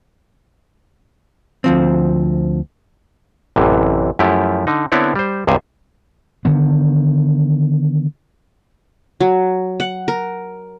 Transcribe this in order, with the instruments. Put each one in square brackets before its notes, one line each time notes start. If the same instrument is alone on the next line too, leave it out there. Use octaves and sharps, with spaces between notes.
[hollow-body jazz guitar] D2 F3 C4
[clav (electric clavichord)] A1 F#2 C3 E3
F#2 F3 A3 E4 G4
D3 D#4
D3 B3 C4 E4 C#5 D5
G3 C5
C#2 G2 C3 C5 G#5
[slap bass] D3 D#3 B3
[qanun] F#3
F#5
A#4